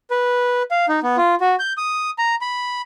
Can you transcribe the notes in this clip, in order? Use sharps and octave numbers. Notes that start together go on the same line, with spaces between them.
B4
F5
D#4
B3
F4
F#4
G6
D#6
A#5
B5